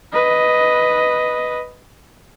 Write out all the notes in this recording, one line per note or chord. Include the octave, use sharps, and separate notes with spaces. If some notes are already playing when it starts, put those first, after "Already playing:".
B4 D#5